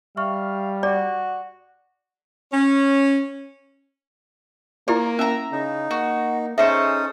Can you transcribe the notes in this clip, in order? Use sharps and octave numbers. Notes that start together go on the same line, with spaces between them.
G3 E5 F5 C#6 F6
F#4 D5 D6
C#4
A#3 E4 G4 A#4 D5
C#4 E5 A#5
C#3 D#4
A#3 F#4
C#4 D#4 G#4 A4 C5 E5 C#6 D#6